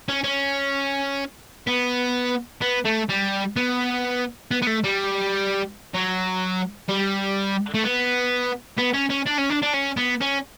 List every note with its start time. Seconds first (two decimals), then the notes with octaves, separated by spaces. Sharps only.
0.09 C#4
0.24 C#4
1.67 B3
2.61 B3
2.85 A3
3.10 G3
3.56 B3
4.51 B3
4.62 B3
4.67 A3
4.84 G3
5.94 F#3
6.88 G3
7.74 A3
7.84 B3
8.78 B3
8.94 C#4
9.10 C#4
9.27 D4
9.39 C#4
9.50 D4
9.62 D4
9.74 C#4
9.97 B3
10.21 C#4